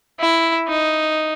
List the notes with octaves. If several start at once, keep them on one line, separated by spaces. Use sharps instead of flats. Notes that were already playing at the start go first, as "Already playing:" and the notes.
E4
D#4